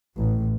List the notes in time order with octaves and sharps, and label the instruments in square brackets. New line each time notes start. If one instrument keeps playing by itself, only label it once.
[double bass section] A1